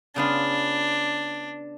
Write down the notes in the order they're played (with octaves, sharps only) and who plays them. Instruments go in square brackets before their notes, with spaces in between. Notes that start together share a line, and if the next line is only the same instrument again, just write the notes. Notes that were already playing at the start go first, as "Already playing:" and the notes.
[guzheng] C#3 B3 F4 [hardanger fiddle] D4